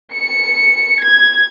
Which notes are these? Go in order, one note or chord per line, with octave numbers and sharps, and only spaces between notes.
C#7
G#6